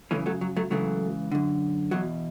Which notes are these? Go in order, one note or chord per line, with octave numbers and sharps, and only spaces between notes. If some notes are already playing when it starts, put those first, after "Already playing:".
F#2 C#3 E3 A3 C#4
F#3 A3
F#3
F#3 A3
C#2 C#3 E3 F#3 A3
F#2 D3
E2 B2 F#3